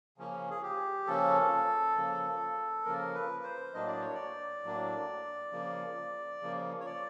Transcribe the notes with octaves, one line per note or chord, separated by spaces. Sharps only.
C#3 F3 A#3 C#4
G#4
G4
C#3 F3 A#3 C#4 A4
C#3 F3 A#3
C#3 F3 A#3 A#4
B4
C5
A2 F#3 A#3 D4 D#5
D5
C#5
D5
A2 F#3 A#3 D4
C#3 F3 A#3
C#3 F3 A#3
C#5
D5